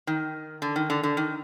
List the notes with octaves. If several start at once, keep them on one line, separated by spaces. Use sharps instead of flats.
D#3
D3
D#3
D3
D3
D#3